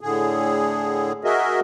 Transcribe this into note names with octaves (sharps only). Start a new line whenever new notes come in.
A2 D3 G#4
F#4 G#4 A#4 D#5 E5